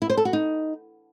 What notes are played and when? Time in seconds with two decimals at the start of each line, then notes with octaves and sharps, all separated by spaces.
0.02 E4
0.10 C5
0.17 A4
0.25 F#4
0.33 D#4